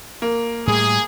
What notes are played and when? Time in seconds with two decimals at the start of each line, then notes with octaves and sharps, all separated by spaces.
0.22 A#3
0.67 A2 G3 G#4